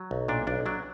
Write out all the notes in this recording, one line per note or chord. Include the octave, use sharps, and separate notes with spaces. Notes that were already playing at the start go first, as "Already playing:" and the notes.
Already playing: F#3
B1
A#2 D4
B1 D4
F#3 D4